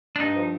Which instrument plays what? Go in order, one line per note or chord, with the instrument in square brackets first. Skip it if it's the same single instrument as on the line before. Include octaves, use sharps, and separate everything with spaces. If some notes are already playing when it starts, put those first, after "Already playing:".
[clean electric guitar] D4
[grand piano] G2 [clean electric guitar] D#4
[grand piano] F3